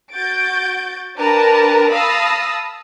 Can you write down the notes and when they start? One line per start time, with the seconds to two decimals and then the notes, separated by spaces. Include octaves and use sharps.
0.14 F#4 G6 A6 D7
1.18 D4 G4 A#4 B4 A5 A#5
1.92 F5 A5 B5 D#6 E6 A#6